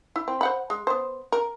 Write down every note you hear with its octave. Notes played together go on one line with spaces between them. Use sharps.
E4
C4
C5 F#5 B5
G#3
B3 C5
A#4